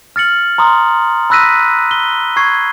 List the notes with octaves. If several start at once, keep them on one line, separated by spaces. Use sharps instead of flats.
F6 A6 C#7 F#7
A#5 C6 D#6
B5 E6 F#6 A#6 B6 D#7
G7
C#6 G#6 C7